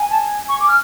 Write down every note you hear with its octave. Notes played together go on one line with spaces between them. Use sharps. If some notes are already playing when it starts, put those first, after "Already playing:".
Already playing: G#5
A5
C#6
D6
F6